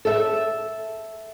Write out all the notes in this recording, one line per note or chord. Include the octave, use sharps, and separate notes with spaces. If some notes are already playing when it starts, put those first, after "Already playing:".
A4 E5